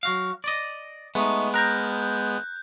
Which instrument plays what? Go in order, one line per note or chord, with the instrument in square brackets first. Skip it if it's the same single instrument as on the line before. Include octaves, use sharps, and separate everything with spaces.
[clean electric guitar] F#3 F#4 F5
D5 D#5
[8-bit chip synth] G#3 B3 [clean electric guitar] A3 D#4
[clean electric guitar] A#4 A#5 [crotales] F#6 G6